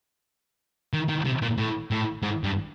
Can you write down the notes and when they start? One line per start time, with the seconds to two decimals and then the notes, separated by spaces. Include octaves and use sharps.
0.93 D#3
1.09 D#3
1.25 C3
1.42 A#2
1.58 A2
1.91 A2
2.22 G#2
2.44 G2